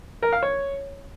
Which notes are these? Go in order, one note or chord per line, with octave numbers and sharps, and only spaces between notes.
A#4
F5
C#5